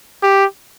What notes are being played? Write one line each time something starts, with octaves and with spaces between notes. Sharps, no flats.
G4